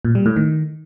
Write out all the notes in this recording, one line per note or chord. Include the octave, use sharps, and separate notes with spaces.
A#2
G3
A2
D#3